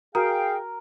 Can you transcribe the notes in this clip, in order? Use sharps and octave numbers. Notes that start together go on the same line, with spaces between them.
F#4 G#4 A#4 F5 G5